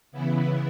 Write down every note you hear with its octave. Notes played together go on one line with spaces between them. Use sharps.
C#3 E3 B3 E4